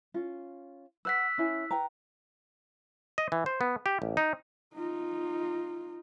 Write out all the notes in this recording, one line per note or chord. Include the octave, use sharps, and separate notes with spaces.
C#4 F4
B4 F#5 E6 F#6 B6
C#4 E4 G#5
B4 G5 A#5
D#5
E3
C5
B3
G4
A1
D#4
D#4 F4